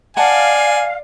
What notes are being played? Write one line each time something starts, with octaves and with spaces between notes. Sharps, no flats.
D5 D#5 F5 F#5 G#5 A5